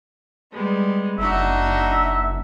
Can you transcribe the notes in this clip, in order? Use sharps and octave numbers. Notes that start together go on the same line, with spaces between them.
G3 G#3 B3
F#1 D4 D#4 F#4 E5